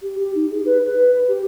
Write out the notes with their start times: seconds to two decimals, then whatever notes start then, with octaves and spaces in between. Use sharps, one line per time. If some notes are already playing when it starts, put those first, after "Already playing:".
0.02 G4
0.18 G4
0.35 D#4
0.50 G#4
0.65 B4
0.83 B4
1.28 G4